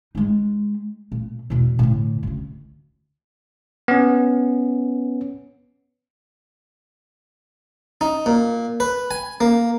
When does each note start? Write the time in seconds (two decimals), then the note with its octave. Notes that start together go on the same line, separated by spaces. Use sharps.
0.15 G#3 D#4
1.12 A#2
1.50 E2 B2
1.79 A2 D3
2.23 D2 C#3
3.88 B3 C#4
8.01 D#4
8.26 A#2
8.80 B4
9.11 G#5
9.41 A#3